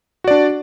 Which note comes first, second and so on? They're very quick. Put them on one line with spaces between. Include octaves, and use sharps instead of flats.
F#4 D5 D4